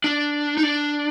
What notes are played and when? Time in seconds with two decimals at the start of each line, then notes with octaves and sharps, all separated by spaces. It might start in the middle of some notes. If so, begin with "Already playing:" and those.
0.04 D4
0.57 D#4
0.63 D4